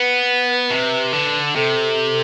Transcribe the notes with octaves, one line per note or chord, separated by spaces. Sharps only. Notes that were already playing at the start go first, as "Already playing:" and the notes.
Already playing: B3 B4
C3
D3
C3 A4